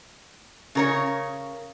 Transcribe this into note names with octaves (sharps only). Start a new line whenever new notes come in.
C#3 A#4 C#5